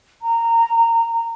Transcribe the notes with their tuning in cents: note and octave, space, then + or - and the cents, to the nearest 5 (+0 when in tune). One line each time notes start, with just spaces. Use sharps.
A#5 -20